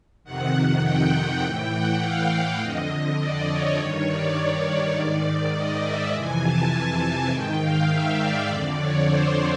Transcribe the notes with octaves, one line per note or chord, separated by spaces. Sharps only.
F2 C3 D#3 F#5
G5
A2 E3 G5
F#5
F5
F5
F2 D3 D#5
D5
C#5
G2 D#3 C#5
D5
C#5
D5
G#2 D#3
D5
D#5
E5
F2 C3 E3 G#5
A5
G#5
G#2 D#3 G5
F5
E5
D5
F2 D3
C#5
C5